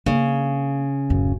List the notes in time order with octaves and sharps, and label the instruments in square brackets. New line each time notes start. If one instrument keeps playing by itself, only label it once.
[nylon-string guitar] C#3 [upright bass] A#3
[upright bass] D1 F#2